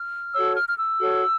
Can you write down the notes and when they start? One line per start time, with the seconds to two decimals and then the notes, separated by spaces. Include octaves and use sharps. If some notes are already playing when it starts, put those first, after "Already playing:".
Already playing: F6
0.33 F#4 A4 C#5 E6
0.55 F6
0.68 F6
0.77 E6
1.00 F#4 A4 C#5